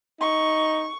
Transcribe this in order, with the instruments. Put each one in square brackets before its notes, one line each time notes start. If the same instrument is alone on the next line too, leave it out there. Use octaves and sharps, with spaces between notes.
[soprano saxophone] D#4 [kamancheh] C#6